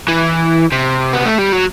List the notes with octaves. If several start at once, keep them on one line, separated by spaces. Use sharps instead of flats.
E3
C3
B3
A3
G3
F#3